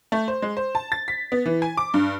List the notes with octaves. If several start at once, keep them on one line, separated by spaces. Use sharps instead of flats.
A3
C5
G#3
C5
A5
A6
B6
B3
E3
G#5
D6
G2